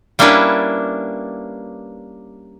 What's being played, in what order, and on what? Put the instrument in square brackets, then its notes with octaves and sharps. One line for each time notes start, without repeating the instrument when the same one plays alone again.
[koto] G3 A#3 C#4 D4 E4 B4